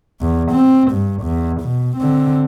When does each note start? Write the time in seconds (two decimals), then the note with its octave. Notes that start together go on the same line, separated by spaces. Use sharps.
0.22 E2
0.52 C4
0.91 G2
1.23 E2
1.61 B2
1.97 D3 C4